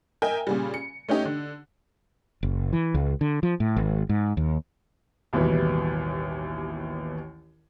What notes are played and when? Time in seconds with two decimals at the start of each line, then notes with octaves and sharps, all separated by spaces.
0.22 A#4 D#5 E5 G5 G#5
0.47 A#2 C#3 G3
0.74 C#7
1.09 A3 C#4 D#4 G4 D#5
1.25 D3
2.43 F#1
2.73 E3
2.94 C#2
3.21 D3
3.43 F3
3.60 A2
3.76 G#1
4.09 G#2
4.37 D#2
5.33 A1 D#2 B2 E3 G3